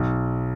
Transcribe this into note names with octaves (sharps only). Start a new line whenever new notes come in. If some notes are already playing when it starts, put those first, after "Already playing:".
Already playing: B1